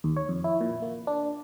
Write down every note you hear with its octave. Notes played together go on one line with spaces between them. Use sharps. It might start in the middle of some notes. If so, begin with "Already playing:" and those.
D#2
C#5
F2
E4
A#2
A#3
D4